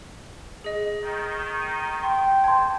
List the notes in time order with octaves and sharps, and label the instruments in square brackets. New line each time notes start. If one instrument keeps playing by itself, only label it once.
[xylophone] G#4 D#5
[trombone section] D#3
[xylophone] D#7
[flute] G5 [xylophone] C6
[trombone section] D3 C4 C5 [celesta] A5 C6 [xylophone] G#6